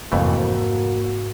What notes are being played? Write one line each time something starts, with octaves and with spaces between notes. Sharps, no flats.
F2 G#2 C3 E3 A3 A#3 F#4